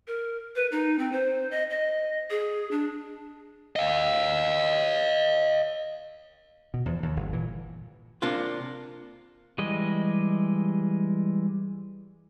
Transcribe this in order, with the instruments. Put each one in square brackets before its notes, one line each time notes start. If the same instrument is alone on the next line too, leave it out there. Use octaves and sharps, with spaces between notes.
[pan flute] A#4
B4
D#4
C4
C5
D#5
D#5
G#4
D4
[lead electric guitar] D#5 F5
[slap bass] B2
E2 F3
D#2
G1
A#2 E3
[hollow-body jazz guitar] C3 A#3 D4 F4
[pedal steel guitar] E3 G3 G#3 D#5